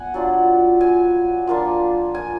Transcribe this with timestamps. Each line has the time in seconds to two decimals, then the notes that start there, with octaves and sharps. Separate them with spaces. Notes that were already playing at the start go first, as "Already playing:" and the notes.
Already playing: B3 F#5 G#5
0.14 F#3 D4 F4
0.81 G#5
1.47 F3 A#3 D4 F4
2.15 G#5